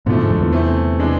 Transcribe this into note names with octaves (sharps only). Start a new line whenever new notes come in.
G#2 B2 D3 F3 A3
G#2
F2
E2
C3 E3 A3 C4
C3 E3 G#3 D4